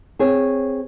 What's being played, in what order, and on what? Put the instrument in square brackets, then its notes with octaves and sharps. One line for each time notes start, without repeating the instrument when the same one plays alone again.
[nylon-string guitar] C4 G#4 C#5